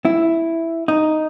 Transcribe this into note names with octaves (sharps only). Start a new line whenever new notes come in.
E4
D#4